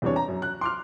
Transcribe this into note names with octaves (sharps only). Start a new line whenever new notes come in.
E2 C3 G3 D4 C#5
A#5
F#2
F#6
C6 D6 F6